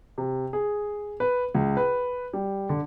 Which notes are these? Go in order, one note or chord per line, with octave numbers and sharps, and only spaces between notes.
C3
G#4
B4
C#2
B4
G3
D3